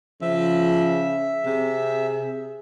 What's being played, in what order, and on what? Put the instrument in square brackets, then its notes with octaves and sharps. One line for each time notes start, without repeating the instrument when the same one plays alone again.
[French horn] C#3 [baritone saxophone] F3 [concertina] E5
[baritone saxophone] C3 [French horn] G#4